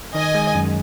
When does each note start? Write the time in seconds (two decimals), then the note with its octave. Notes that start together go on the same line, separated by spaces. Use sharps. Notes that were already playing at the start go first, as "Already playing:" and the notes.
0.15 D#3 D#5 G#5
0.35 G#3
0.55 F#2